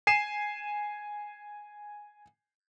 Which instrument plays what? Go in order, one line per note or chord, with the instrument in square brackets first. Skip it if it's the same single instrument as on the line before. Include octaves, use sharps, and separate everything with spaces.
[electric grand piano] G#5 C7 D#7 E7